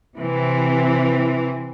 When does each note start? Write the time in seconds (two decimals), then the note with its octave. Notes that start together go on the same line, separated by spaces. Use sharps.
0.17 C3 E3 C4